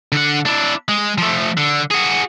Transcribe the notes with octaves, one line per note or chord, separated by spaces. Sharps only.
D3 F#5
D4 E4
G#3
F3 A3
D3
F#4 G#4